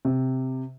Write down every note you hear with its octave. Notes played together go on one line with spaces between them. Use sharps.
C3